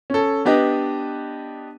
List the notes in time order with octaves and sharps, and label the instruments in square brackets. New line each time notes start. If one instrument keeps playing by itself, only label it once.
[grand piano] C#4 A4
B3 D4 G4 B4 D#5